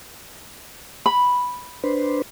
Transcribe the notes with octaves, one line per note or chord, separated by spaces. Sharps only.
B5
D4 B4 C5